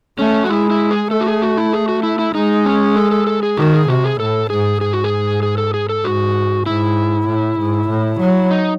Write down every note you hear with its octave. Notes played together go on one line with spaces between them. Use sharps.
A3 C#4
F#4
G#3 E4
E4
G#4
A3 A4
F#4
G#4
F#4
E4
G#4
F#4
E4
E4
G#3 D#4
C#4
A4
A4
A4
G#4
D#3 F#4
G#4
C3 F#4
G#4
A2 A4
G#2 G#4
G#2 G#4
F#4
G#4
G#4
A4
G#4
A4
G#2 F#4
G#2 E4
A2
G#2
A2
F#3
D#4